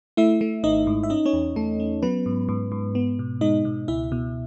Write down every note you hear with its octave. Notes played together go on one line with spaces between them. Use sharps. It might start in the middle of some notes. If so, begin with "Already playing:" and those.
A3 E4 E5
A3
G#1 D#4 D#5
G#2
E5
C#4 D#4 D#5
C#4 C#5
E2
E2 A3 A4
C#4
F#3 B3 B4
G#2
G#2
G#2
B3
B2
G#3 D#4 D#5
B2
C#2 E4 E5
B2